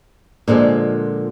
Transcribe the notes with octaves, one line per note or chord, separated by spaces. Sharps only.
A#2 D3 F3 G#3